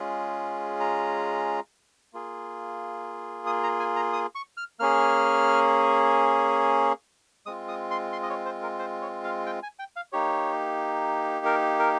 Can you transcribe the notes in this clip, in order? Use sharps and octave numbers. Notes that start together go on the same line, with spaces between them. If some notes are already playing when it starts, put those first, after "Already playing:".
Already playing: G#3 C#4 F4 G#4
A#5
A#3 F4 G#4
D#6
A#5
G#5
A#5
D#6
C#6
F6
A#3 C#4 G#4 F6
G#3 C4 F4 D#6
D#6
C6
C6
D#5
C#5
C5
A#4
C5
C#5
F5
G5
G#5
G5
F5
A#3 D#4 G4 C#5
A#4
A#4